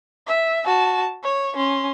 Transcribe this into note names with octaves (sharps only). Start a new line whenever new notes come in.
E5
F#4 A5
C#5 C#6
C#4 C6